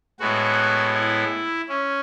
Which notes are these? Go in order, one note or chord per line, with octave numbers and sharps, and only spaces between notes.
A2 G#3 B3 F#4
E4
C#4